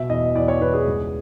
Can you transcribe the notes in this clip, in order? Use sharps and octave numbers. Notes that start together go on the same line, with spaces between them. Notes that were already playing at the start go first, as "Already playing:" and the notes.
Already playing: B2 E5
E2 D#5
E2 D5
C#5
E2 B4
G#4
C#2